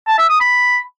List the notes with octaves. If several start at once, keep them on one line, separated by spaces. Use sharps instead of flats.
A5
E5
D#6
B5